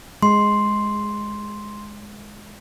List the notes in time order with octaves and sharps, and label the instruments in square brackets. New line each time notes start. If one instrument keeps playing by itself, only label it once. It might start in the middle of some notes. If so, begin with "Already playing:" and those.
[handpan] G#3 [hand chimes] C6